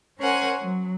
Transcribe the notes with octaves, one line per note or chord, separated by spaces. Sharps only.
C#4 A#4 C5 C#5 F#5 G#5
F#3